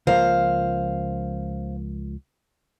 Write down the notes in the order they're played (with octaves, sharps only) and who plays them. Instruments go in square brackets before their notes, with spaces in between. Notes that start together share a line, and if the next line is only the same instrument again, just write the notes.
[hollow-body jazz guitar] C#2 F3 A#3 [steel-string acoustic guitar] C5 F5